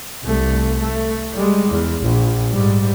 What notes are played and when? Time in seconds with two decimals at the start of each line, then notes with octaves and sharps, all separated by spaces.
0.23 C2 A3
0.79 A3
1.33 G3 G#3
1.69 E2
2.02 A#1
2.51 G#2 G3